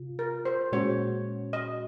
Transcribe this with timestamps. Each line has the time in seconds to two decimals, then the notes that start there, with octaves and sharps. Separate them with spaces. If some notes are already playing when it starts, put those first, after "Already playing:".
Already playing: C3 F4
0.19 A#4
0.45 C5
0.72 A#2 G#3 C#4 F#4 C#5
1.53 D#5